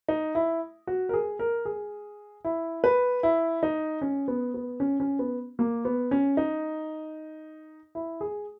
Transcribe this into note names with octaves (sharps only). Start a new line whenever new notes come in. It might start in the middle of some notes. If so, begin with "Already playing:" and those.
D#4
E4
F#4
A#4
G#4
A#4
G#4
E4
B4
E4
D#4
C#4
B3
B3
C#4
C#4
B3
A#3
B3
C#4
D#4
E4
G#4